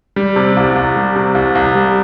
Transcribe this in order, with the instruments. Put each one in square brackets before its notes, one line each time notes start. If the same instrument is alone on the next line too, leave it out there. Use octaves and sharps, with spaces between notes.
[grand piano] G3
C3
C2
C2
G3
C3
C2
C2
G3